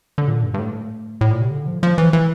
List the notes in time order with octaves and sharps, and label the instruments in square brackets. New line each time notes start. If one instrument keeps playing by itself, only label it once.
[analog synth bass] D3
A#2
G2
G2
A2
A2
A#2
C3
D3
F3
F3
E3
E3